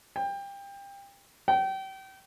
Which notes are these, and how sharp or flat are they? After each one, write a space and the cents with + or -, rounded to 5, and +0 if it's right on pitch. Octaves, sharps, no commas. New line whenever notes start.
G5 +25
G5 -30